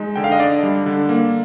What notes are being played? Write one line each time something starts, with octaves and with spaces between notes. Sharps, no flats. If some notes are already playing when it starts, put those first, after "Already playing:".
Already playing: G#3 D#4
D3 G5
F5
D#5
D4 D5
G3
D3
A#3